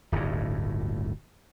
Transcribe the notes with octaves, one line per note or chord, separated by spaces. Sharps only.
D1 G1 D#2 A2